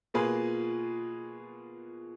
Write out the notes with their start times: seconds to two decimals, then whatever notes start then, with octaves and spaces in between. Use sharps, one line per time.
0.14 B2 A#3 F4 G#4 B4